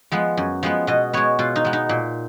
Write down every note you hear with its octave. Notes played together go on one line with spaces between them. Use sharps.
F3 G#3 B3
F#2
F3 G#3 B3
B2 D#5
G#3 B3 C#5
B2 F4
D#4
G#3 B3
D#4
A#2